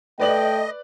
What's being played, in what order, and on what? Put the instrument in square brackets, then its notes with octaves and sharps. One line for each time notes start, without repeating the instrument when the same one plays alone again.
[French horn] A3 [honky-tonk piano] B4 D5 F#7 [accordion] D#5 [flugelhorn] G5